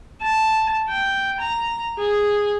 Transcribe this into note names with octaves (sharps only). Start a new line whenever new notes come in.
A5
G5
A#5
G#4